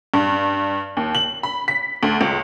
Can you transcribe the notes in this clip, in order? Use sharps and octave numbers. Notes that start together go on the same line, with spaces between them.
G2
D#2
F#7
B5
B6
D2
C#2